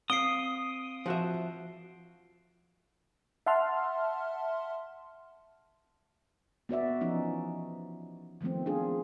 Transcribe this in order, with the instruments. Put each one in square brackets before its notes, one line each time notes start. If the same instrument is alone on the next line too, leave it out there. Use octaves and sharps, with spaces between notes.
[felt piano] C4 F5 [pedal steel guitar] D#6 [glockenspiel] C7 D7 G7
[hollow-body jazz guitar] F3 F#4 E5
[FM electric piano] E5 F#5 A5 C6 F6
[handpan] B3 F#4 D5 E5
E3 F3 C#4 D#4
D#3 F3 A3 B3 C4
D4 F4 G#4